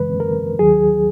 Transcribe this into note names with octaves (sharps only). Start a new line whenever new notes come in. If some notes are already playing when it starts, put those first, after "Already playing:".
Already playing: F#2 C#3 E3 G#3 B4
A#4
D#2 D#3 F#3 G#4